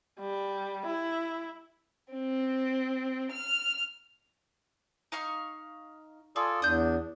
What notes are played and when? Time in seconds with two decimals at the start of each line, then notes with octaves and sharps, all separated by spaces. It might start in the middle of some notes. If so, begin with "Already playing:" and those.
0.20 G3
0.87 E4
2.13 C4
3.32 F6
5.12 D#4 F5 C#6
6.36 F4 G#4 A4 D5
6.62 E2 D4 D#6 G6